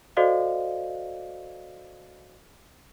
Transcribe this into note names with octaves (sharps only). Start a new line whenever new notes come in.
F#4 A4 C5 D5 D#5 F5